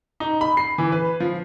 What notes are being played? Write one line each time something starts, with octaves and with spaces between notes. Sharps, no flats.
D#4
B5
C7
E3
B4
F3